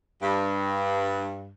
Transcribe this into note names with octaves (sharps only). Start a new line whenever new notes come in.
G2